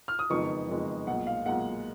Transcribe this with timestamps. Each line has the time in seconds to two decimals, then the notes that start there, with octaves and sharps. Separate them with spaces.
0.08 F6
0.19 D#6
0.30 F#1 F2 D#3 G#3 B3 C#6
0.68 F#1 F2 D#3 G#3 B3
1.07 B1 A#2 G#3 F#5
1.27 F5
1.46 B1 A#2 G#3 F#5